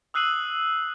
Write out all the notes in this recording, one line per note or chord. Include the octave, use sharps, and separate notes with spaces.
D#6 E6 F#6 C7 D#7 F#7